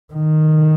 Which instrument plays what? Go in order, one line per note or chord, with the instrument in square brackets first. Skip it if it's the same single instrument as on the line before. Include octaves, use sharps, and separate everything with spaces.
[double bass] D#3